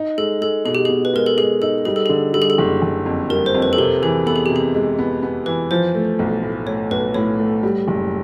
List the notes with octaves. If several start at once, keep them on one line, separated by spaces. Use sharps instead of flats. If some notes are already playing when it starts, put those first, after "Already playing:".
Already playing: D#4
G#3 A4
G#3 A4
B2 G#4
G4
B2 G#4
B4
G#3 A#4
A4
G#3 G#4
D#4 A4
G3 G#4
A4
D3 G#4
G3 A4
G#4
A4
F#1
F#1
F2
G3 A#4
C5
F2
B4
A4
C3 A#4
E3 G#4
B3 A4
G#4
C3 G4
G#4
G#3
B3
B3
E3 B4
F3 C5
A3
B1
A2
A3 C#5
B1 B4
A2 C#5
A3
G3
F#1